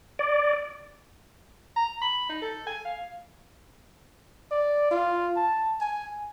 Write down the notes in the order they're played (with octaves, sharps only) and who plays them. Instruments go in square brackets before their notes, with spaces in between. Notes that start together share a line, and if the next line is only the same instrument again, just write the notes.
[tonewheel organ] D5
[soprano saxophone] A#5
B5
D#4
A4
G#5
F5
[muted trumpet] D5
F4
A5
G#5